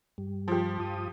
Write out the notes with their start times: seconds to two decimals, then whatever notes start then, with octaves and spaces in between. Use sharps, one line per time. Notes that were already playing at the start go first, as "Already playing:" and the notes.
0.18 G2 G3
0.48 F3 G4
0.80 G2 F4 D#6